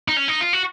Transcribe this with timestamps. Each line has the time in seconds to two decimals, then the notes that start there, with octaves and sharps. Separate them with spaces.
0.08 D#4
0.17 C#4
0.28 D#4
0.41 F4
0.53 F#4